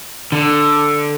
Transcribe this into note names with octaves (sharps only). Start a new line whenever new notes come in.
D3